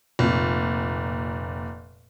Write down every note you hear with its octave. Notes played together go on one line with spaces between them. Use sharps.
F1 A#2